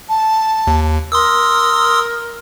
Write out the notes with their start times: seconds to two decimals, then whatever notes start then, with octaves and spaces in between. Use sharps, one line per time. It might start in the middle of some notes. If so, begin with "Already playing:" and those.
0.09 A5
0.67 D#2
1.12 A#4 C6 D#6 E6